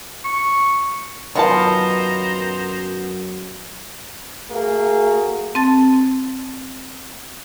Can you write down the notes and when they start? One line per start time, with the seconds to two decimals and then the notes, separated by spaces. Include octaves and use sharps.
0.25 C#6
1.35 F#2 D#3 F#3 B3 F4 C5 A5 A#5
4.51 A3 A#3 F#4 G#4
5.55 C4 A5 A6